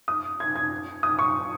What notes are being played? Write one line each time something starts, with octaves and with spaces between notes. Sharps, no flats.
D#6
G#6
G#6
D#6
C#6